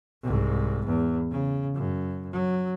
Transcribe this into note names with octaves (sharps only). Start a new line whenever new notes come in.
C2 G#2
E2
C#3
F#2
F#3